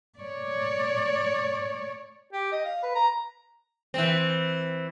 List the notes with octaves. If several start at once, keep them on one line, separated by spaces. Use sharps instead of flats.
C#5 D5
G4
D#5
F5
B4
A#5
E3 C4